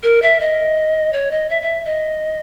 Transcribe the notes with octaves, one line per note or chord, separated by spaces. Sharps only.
A#4
E5
D#5
C#5
D#5
E5
E5
D#5